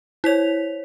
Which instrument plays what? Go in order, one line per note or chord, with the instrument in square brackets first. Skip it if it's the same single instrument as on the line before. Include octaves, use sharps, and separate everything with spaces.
[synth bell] E4 B6 F7 [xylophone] C5 C#5